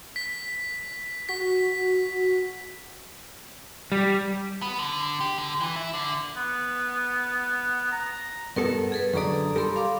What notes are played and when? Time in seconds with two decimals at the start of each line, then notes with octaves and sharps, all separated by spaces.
0.16 B6
1.29 F#4 B6
3.92 G3
4.62 B3
4.79 D3
5.20 G4
5.38 D3
5.61 E3
5.76 E4
5.94 D3
6.36 B3
7.92 A#5
8.56 G2 B3 A4 A#4 F#5
8.92 G#4 A4 B4
9.14 F#2 D3 A4 D5 A#5 D#6
9.56 G3 G4 A4 A#4 B5 C6
9.76 F5 D6